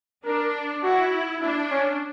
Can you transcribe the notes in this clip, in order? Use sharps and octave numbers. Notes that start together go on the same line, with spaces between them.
D4 A#4
E4 F#4
D4 E4
C#4